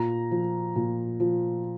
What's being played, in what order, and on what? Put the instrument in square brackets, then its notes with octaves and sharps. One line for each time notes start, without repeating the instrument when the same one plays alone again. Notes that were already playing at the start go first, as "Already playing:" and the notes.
Already playing: [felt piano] A#2 A#5
F3
A#2
F3